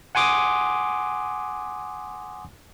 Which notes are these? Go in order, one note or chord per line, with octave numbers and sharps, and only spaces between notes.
F#5 G#5 C6 D6 D#6